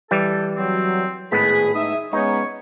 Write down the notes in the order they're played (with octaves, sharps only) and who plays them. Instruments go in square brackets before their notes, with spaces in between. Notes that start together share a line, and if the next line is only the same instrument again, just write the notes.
[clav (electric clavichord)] E3 G3 [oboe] A4
[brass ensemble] F#3 [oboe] C4
[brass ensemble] G#1 G#4 [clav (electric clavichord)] A2 G#3 B3 [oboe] B5
[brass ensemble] D#4 E5 [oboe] D#6
[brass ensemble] G#3 B3 C#4 [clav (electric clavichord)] D#4 [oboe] C#5